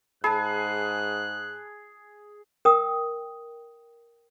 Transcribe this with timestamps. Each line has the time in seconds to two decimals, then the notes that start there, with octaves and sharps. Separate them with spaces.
0.24 G#2 G#4 A5 B5 F#6
2.65 A#4 G5 D#6